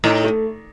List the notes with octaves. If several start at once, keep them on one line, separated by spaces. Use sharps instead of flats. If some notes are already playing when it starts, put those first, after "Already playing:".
A2 D#4
A3